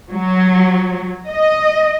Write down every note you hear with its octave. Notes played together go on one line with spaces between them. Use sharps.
F#3
D#5